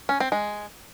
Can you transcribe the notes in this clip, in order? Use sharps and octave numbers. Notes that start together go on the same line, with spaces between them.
C#4
C4
G#3